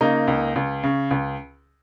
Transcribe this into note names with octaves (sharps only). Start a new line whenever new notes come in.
C#3 A#3 D#4
C#2
C#2
C#3
C#2